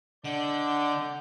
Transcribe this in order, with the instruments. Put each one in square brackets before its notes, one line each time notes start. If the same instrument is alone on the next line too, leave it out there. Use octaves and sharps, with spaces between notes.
[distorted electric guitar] D3 [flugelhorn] D4 [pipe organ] D5 G6 [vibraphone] D#5 F#5